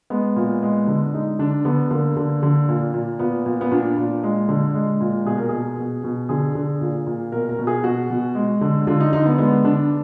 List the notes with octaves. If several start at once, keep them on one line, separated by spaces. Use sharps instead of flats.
G#3 B3
A#2
G#3
D3
G#3 D#4
D3 D4
D3 B3
D3 A#3
D3
D3
A#2
A#2
A#2 B3
A#2
B3
A#2 D4
A#2
G#3
D3
G#3
A#2
B2 G#4
A#4
B2 G#4
B2
B2
D3 G#4
D3
A#2
A#2
B2 A#4
A#4
B2
G#4
B2 F#4
B2
G#3
D3
D3 F4
D#4
D3 D#4
B3
G#3 B3
D3 D4